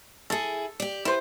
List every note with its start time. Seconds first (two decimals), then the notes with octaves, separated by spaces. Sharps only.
0.30 E4 G#4 A4
0.80 G4 D5
1.05 E4 B4 C5